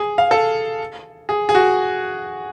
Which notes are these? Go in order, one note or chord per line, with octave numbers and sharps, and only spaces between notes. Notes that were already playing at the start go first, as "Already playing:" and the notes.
Already playing: G#4
F5
A4
G#4
G#4
F#4